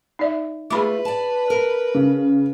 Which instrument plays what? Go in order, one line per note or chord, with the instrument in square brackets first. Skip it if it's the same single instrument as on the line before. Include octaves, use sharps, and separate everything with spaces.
[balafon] D#4 D5 E5
[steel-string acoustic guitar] A3 F4 [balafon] G#4 B5 D6 [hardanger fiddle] B4
[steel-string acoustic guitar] D5 A5
A#4
[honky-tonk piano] C#3